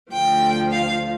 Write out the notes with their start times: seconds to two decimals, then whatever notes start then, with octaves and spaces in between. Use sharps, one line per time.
0.12 D2 D3 F3 G5
0.72 F5